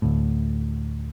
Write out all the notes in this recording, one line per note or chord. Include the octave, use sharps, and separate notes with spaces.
D2 A2